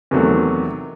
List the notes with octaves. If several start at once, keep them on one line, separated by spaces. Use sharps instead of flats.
E2 C3 D#3 F#3 A3